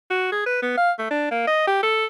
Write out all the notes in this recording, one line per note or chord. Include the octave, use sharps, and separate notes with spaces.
F#4
G#4
B4
B3
F5
A3
D4
A#3
D#5
G4
A4